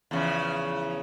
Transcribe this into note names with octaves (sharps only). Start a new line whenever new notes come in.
E2 C#3 F3